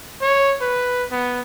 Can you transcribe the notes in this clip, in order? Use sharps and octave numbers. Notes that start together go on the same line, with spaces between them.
C#5
B4
B3